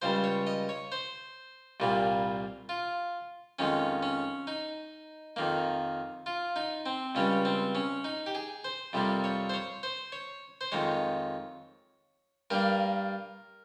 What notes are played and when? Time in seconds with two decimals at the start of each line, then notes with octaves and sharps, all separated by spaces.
0.02 C#2 C#3 G3 C5
0.24 C#5
0.47 D#5
0.69 C#5
0.92 C5
1.80 C2 A#2 G3 A#3
2.69 F4
3.59 F2 D#3 G#3 C#4
4.03 C#4
4.47 D#4
5.36 F2 D#3 A#3
6.26 F4
6.56 D#4
6.86 C4
7.15 C#2 C#3 G3 C#4
7.45 C4
7.75 C#4
8.04 D#4
8.26 G4
8.35 G#4
8.64 C5
8.93 F2 C3 G3 A#3
9.24 C#5
9.49 C5
9.54 C#5
9.83 C5
10.12 C#5
10.61 C5
10.72 F2 D#3 G#3 C#5
12.50 G2 G3 A#3 A#4